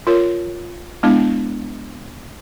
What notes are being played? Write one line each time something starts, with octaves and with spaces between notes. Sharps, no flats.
F4 A#4 C#5
G#3 B3 D4 E4 A5